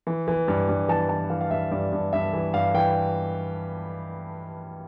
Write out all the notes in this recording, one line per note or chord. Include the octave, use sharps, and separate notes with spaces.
E3
E3
G2
G2
E3 A5
E3 A5
E3 F5
F5
G2 E5
G2 D5
G2
G2 E5
E3
G2 F5
E3 G5